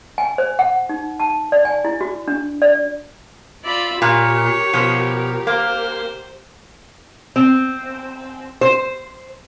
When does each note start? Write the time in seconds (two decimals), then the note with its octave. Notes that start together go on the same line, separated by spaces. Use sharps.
0.18 G#5
0.38 C5
0.59 F#5
0.89 D#4
1.20 A5
1.52 D5
1.65 G#5
1.85 E4
2.01 F#4
2.28 D4
2.62 D5
3.64 F4 D5 E5 B5
4.02 A#2 G4 A#4 C#5
4.73 B2 F3
5.47 A#3 C5
7.36 C4
8.61 C5